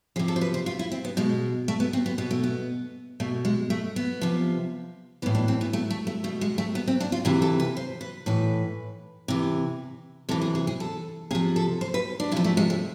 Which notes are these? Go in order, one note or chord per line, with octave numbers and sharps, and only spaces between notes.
C3 F3 G#4
A4
C5
B4
C5
F4
E4
C4
B3
B2 G#3
A3
B3
C4
B3
B2 B3
A3
B3
B2 A3
G#3
A3
B3
C3 F3
A2 E3 B3
D4
C4
B3
A3
A3
A3
B2 A3
G#3
A3
B3
C4
D4
F4
C3 E3 G#4
A4
B4
C5
B4
A2 E3 B4
C3 E3
C3 E3 A4
G#4
G#4
G#4
A4
C3 F3 G#4
A4
C5
B4
D4
C3 F3 E4
A3
G#3
A3